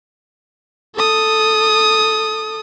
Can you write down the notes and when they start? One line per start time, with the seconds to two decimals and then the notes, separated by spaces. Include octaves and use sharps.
0.95 A4 D#6